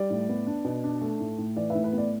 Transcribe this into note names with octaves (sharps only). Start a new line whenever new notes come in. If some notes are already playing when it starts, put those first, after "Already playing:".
Already playing: G3 D5
A2
B3
D4
B2
D4
A3
A2
A2
E3 D5
B4 E5
A2
B4
B3
D5